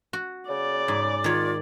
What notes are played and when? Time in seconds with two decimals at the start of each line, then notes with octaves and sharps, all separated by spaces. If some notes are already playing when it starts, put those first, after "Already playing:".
0.13 F#4
0.50 C#3 D5
0.88 G#2
1.24 D#3 F4 C#5